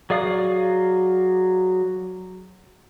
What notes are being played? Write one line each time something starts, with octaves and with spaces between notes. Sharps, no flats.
F#3 G#4 D5 F5 D#6